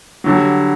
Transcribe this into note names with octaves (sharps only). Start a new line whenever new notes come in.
D3 F#3 G3